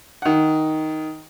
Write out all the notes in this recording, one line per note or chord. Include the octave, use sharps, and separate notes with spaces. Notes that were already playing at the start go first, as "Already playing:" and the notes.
D#3 F#5